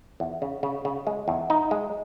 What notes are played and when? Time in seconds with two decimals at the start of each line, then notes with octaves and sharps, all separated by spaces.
0.20 E2
0.42 C#3
0.63 C#3
0.85 C#3
1.07 G#3
1.28 E2
1.50 D#4
1.71 G#3